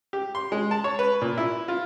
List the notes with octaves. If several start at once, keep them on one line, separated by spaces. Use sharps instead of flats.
G4
C6
G#3
A5
C#5
B4
A#2
E4
F4